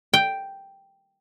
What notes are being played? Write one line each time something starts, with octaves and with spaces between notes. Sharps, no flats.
G5